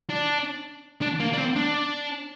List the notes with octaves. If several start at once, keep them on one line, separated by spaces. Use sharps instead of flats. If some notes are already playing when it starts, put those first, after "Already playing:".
D4
D4
A#3
D4
C4
D4